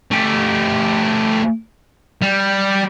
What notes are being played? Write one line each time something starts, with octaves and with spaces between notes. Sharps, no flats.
A3 G4
G3